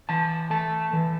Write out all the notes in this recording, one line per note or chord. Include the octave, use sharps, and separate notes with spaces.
E3 A5
A3 A5
E3